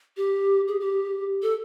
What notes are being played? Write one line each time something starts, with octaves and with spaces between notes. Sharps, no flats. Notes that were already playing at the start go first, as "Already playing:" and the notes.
G4
G#4
G4
A4